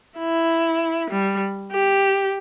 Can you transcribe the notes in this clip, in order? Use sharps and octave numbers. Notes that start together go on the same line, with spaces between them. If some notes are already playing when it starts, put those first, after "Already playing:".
E4
G3
G4